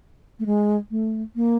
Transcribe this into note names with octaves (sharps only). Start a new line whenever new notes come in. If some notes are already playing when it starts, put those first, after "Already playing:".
A3
G#3
A3
A#3